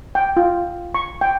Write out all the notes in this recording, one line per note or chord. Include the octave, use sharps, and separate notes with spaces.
G5
F4
C#6
G5